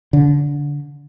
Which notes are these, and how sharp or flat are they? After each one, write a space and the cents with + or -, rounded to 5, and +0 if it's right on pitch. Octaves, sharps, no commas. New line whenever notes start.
D3 -20